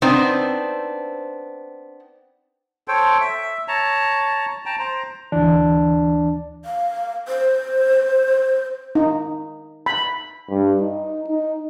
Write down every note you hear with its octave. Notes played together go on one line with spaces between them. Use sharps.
B3 C4 D4 D#4 C5
A4 C5 C#5 G5
E5
C#5 A5 A#5
G5 A5 A#5
C5 A#5
D2 E3 D4
F5
C5
D#4
B5
G2
D#4
D#4